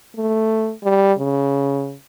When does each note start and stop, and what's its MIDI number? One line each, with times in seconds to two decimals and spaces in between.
0.16 0.72 57
0.84 1.13 55
1.18 1.95 49